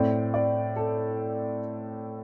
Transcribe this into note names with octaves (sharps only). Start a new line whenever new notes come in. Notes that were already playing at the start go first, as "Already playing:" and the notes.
Already playing: A2 A3 C4 D5
D5
A4